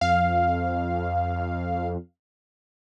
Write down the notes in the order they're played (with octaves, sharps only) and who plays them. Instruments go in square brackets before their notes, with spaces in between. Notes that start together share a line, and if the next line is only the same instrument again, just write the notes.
[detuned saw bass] F2 [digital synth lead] F5